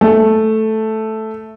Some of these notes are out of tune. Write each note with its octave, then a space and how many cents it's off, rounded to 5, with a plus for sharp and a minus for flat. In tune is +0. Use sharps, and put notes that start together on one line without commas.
A3 -5